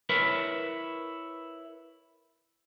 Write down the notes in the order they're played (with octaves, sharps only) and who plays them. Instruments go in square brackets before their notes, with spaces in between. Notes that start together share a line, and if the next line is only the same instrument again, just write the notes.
[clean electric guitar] E4 A#4 B4 C#5